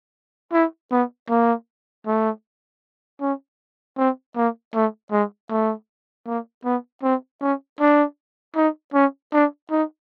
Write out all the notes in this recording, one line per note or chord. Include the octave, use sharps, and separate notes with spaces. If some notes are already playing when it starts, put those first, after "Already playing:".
E4
B3
A#3
A3
C#4
C4
A#3
A3
G#3
A3
A#3
B3
C4
C#4
D4
D#4
C#4
D4
D#4